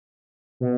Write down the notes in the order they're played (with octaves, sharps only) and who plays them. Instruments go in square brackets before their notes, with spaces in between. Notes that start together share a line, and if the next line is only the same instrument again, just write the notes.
[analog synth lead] B2